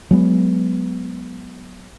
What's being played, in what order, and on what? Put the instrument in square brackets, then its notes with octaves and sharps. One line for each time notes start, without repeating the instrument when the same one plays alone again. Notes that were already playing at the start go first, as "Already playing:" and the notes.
[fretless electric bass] F#3 G#3 B3